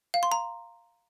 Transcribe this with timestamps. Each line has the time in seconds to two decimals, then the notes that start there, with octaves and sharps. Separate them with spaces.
0.14 F5
0.23 C6
0.32 A#5